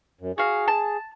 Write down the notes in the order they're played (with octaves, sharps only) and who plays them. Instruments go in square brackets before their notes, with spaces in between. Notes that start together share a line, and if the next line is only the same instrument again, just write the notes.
[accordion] F#2
[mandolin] F#4 F5 [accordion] G#4
[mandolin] A5